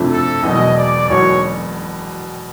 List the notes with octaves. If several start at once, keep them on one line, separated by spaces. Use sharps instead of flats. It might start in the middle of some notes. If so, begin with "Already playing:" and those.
Already playing: F2 C3 F3 A3 D4
A4
E1 E2 B2 F#3 D#5
D5
E1 E2 B2 F#3 C#5